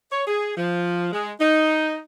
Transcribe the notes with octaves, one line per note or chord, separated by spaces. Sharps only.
C#5
G#4
F3
G#3
D#4